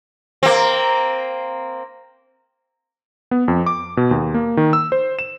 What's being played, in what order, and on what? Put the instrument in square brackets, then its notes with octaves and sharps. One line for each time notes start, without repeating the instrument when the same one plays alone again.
[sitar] A#3 C4
[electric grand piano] B3
F2
D6
B2
D#2
A#3
D#3
E6
C5
E7